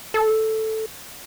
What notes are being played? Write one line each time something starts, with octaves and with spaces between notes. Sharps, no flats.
A4